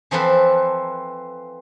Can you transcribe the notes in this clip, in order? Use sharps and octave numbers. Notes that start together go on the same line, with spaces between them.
E3 F3 C4 A4 B4